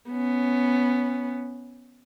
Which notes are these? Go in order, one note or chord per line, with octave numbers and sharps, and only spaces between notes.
B3 C#4